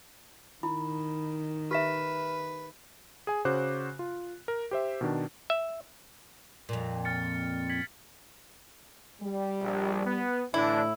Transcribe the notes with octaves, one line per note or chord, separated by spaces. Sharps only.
D#3 E4 B5
G4 B4 E5 F6 B6 E7
G#4 G#5
C#3 F#4 C5 D6 F#6
F4
A#4
G4 C5 E5
B2 D#3 D4
E5
F2 A#2
F6 A6 C#7
G#6 B6 F#7
G3
A#1
B3
A2 D3 E3 D4 E4